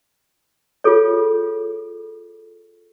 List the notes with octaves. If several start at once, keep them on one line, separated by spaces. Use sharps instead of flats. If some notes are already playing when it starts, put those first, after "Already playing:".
F4 G#4 A4 C#5